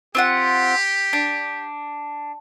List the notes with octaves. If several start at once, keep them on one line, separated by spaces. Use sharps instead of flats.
C4 F4 G4 F#5
D4